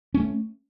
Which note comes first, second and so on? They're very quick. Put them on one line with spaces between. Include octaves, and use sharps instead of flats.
C#4 A#3 A3